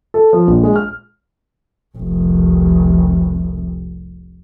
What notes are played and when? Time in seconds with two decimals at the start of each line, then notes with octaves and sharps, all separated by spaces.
0.14 A4
0.33 F3
0.47 A#1
0.63 G#3
0.76 F6
1.98 F1 C2